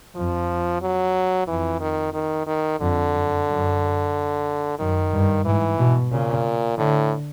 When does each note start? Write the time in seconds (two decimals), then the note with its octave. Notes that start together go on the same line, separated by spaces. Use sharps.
0.15 F2 F3
0.82 F#3
1.47 F2 E3
1.81 D#3
2.14 D#3
2.47 D#3
2.80 F2 D3
3.13 F#2
3.47 F#2
4.79 F#2 D#3
5.12 G2
5.45 G#2 E3
5.79 B2
6.11 A#2 C#3
6.78 A2 D3